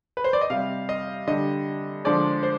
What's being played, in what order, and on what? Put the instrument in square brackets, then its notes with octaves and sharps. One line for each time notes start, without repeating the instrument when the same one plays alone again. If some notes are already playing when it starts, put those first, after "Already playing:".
[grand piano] B4
C5
D5
D#5
C3 G3 F5
D#5
D3 G3 D#5
D3 F3 G#3 D5
C5